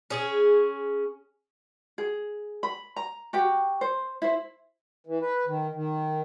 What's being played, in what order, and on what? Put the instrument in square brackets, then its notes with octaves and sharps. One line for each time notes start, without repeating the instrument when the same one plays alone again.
[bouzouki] C#4 G#4
[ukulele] G#4
B5
A#5
F#4 G4 G5
C5
E4 C5
[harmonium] E3
B4
D#3
D#3